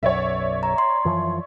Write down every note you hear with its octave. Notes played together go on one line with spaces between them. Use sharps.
B1 F#2 C#5 D5 E5
A#5
C6
F#2 E3 F3